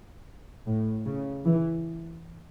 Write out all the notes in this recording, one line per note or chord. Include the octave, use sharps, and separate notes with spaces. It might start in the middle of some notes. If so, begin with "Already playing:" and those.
A2
C#3
E3